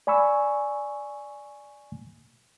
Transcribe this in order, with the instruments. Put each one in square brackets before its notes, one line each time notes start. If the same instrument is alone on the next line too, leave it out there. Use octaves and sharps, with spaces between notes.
[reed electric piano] D5 G#5 B5 C#6 E6